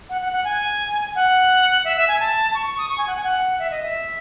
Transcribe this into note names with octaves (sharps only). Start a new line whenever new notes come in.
F#5
F#5
F#5
G#5
F#5
E5
E5
G#5
A5
C#6
C#6
D#6
C#6
G#5
F#5
G#5
F#5
E5
D#5
E5